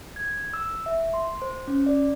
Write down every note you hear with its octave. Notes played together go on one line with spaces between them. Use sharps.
G#6
E6
E5
C6
C5
C#4
D5